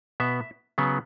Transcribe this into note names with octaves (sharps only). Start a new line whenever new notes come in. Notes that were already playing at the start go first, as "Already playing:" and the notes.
B2 B3 E5
C#3 F#3 B3